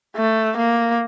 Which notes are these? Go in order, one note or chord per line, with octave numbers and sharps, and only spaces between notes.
A3
A#3